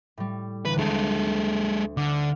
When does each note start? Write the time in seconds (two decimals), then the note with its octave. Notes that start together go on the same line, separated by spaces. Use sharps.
0.17 A2 G3
0.65 D#2 D3 E3 B4
0.78 D2 G#3 C4 A4 G#6
1.97 D3 D6 F6